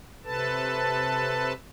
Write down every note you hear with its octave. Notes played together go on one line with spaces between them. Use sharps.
C3 A4 B4 A5